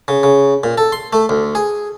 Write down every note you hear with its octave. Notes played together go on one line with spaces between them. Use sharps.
C#3
C#3
A#2
A4
C6
A3
D2
G#4